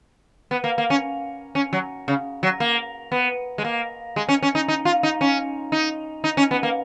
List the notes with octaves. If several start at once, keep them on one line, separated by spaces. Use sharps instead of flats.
B3
A#3
A#3
C#4
C#4
F#3
C#3
F#3
A#3
B3
G#3
A#3
G#3
C#4
C#4
D#4
D#4
F4
D#4
C#4
D#4
D#4
C#4
B3
A#3